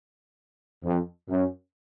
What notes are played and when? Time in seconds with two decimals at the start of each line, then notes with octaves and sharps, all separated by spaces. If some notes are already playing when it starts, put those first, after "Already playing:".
0.84 F2
1.29 F#2